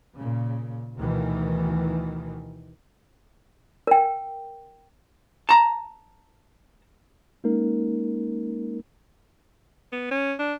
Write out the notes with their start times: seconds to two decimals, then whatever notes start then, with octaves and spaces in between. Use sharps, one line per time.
0.15 A#2 C#3
0.97 D2 B2 D#3 E3
3.87 A#4 G5
5.49 A5 A#5
7.44 G#3 A#3 C#4 D#4 A#4
9.93 B3
10.11 C#4
10.39 D4